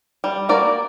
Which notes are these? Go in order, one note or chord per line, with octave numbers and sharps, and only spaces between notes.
G3
A#3 F#4 A#4 D5